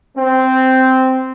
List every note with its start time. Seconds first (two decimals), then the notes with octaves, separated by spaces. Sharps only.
0.17 C4